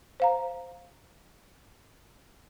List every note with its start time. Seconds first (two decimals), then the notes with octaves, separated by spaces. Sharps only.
0.20 C5 F5 A#5